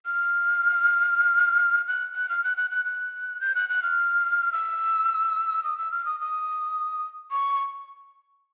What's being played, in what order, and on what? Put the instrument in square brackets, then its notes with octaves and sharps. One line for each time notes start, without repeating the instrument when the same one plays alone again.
[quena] F6
F#6
F#6
F6
F#6
F#6
F#6
F#6
G6
F#6
F#6
F6
E6
D#6
E6
F6
D#6
D#6
C#6